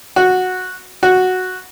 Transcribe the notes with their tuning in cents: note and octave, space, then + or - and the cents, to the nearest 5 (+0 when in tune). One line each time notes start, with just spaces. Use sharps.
F#4 -10
F#4 -5